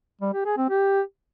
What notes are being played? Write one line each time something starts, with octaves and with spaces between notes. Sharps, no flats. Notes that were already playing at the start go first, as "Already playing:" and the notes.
G3
G4
G#4
C4
G4